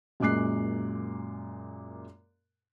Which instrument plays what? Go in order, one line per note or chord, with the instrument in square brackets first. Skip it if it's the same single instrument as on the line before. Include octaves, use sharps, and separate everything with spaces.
[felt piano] F#2 A#2 G#3 D6 F#6 C7